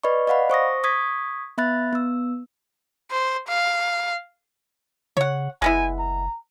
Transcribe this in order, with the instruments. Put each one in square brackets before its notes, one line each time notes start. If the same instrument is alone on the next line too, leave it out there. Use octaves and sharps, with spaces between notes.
[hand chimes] B4 D5 D#5 B5 C#6
D5 D#5 F5 F#5 B5
C5 C#6 D#6 A#6
C#6 D#6 G#6 B6
B3 E5 B5 F#6 A6
B3 E6
[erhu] C5
F5
[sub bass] C#3 [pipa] C#5 F#5
[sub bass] F#1 [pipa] G#3 B3 E4 [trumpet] G#5
[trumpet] A#5